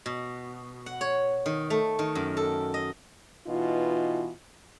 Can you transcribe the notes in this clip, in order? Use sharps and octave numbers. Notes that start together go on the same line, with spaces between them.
B2
F#5
C#5
D#3
A3
D#3
F#2
A4
D#5
B2 E3 D#4 F4